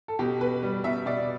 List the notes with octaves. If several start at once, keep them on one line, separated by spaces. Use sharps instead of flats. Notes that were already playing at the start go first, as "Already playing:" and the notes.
A4
B2 G4
B2 B4
G3
B2 E5
B2 D5